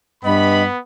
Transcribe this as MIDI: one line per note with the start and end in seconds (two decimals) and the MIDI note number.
0.24 0.67 43
0.24 0.79 59
0.24 0.63 75
0.24 0.67 83